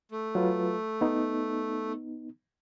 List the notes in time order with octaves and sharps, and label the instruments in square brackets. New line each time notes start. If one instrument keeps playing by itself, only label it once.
[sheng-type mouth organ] A3
[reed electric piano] F#3 F4 B4
B3 D#4